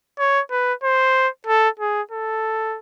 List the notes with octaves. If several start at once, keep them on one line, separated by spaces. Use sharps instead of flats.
C#5
B4
C5
A4
G#4
A4